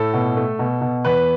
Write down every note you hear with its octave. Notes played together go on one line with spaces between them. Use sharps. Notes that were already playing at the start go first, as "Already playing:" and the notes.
Already playing: A2 A4
B2
A3
B2
B2
E2 B4